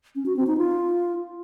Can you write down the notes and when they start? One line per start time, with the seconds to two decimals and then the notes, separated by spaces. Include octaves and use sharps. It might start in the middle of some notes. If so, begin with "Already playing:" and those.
0.15 C#4
0.26 F#4
0.36 C4
0.47 D#4
0.57 F4